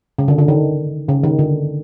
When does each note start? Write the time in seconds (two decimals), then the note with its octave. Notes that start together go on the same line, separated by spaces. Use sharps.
0.18 C#3
0.28 D3
0.38 D3
0.48 D#3
1.09 C#3
1.24 D#3
1.39 D3